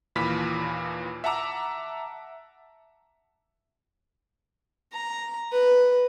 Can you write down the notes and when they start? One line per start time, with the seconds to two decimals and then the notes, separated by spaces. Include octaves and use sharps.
0.16 D#2 A#2 E3 B5 F6 B6
1.24 E5 F#5 A5 A#5 D6 E6
4.92 A#5
5.52 B4